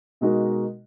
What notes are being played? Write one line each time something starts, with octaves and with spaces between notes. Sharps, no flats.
B2 G#3 D#4 F#4 A#4